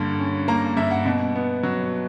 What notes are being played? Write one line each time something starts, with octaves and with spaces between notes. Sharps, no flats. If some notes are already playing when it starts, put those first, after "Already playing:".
Already playing: G2 D3 A#3
C#4
A#3 A#5
G2 E5
F#5
B2
B3
F#3